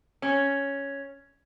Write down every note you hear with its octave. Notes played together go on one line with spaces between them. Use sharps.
C#4